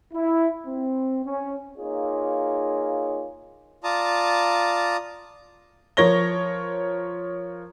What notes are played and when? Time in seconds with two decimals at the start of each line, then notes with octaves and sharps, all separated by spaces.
0.14 E4
0.67 C4
1.25 C#4
1.78 A#3 D#4 F4 G#4 C#5
3.84 F4 D5 A5 A#5 D#6
5.97 F3 A#4 C#5 A#6 G7